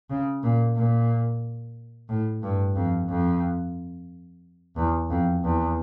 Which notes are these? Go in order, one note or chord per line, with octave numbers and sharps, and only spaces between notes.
C#3
A#2
A#2
A2
G2
F2
F2
E2
F2
E2